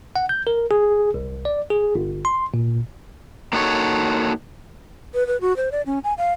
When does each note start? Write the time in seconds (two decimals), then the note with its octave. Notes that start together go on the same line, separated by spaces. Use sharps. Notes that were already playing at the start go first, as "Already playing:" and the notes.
0.16 F#5
0.29 G6
0.47 A#4
0.71 G#4
1.14 C2
1.45 D5
1.70 G#4
1.95 G1
2.25 C6
2.54 A#2
3.53 A#3 D#4 F#4 A4 C#5
5.14 B4
5.27 B4
5.41 F#4
5.57 C5
5.72 D5
5.86 C#4
6.04 G#5
6.18 F5